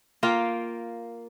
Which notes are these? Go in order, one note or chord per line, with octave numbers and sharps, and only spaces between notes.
A#3 F4 G5